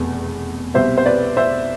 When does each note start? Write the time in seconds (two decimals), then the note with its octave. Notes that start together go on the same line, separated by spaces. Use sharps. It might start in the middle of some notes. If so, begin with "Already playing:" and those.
Already playing: F1 E2 B2
0.74 C2 B2 G3 C4 C5 E5
0.98 C5
1.05 B4 D5
1.37 C5 E5